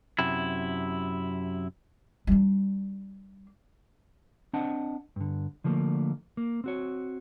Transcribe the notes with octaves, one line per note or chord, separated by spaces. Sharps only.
F#2 C3 E4
G3 D4
C4 D4 C5 D#5 F#5 A5
G2 D3
D3 F3 A3 A#3
A#3
C4 F#4 C#5